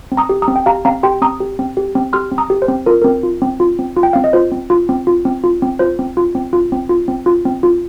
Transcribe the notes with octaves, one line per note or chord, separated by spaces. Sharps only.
C4
A#5 D#6
G4
A#5 D#6
C4
G5
G4 F5 A#5
C4 F5 A#5
G4 G5 C6
C4 A#5 D#6
G4
C4
G4
C4
G4 C6 F6
C4
A#5 D#6
G4
C5
C4
F4 A#4
C4 A#4
F4
C4
F4
C4
F4
G5
C4 F5
D#5
F4 C5
C4
F4
C4
F4
C4
F4
C4
F4 C5
C4
F4
C4
F4
C4
F4
C4
F4
C4
F4